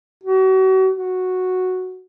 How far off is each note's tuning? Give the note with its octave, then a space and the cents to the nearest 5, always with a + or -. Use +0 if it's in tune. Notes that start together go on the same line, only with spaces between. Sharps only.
F#4 +35
F#4 -5